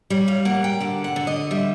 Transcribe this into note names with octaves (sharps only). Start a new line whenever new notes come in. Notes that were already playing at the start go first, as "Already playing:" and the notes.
G3 C#5
F5
A#3 F#5
G5
D3 F#5
F#5
D3
D#5
G3 E5